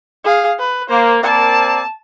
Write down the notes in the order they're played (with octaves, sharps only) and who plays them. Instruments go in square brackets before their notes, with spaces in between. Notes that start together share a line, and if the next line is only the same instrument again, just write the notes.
[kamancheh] G#4 F5
B4
[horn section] A#3 [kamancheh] C5
[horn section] A#3 C4 D5 [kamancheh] A5